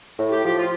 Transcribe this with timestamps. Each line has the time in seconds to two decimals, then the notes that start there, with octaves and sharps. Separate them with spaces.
0.18 A2
0.31 G4
0.44 F3 G4
0.57 F4